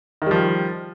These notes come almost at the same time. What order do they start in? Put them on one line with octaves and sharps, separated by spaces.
D#3 G3 F3